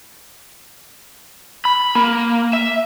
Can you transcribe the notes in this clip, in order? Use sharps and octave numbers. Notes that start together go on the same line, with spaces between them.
B5
A#3
E5